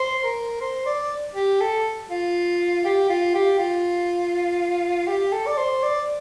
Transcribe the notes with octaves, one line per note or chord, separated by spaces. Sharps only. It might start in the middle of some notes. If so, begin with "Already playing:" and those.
Already playing: C5
A#4
C5
D5
G4
A4
F4
G4
F4
G4
F4
G4
A4
D5
C5
D5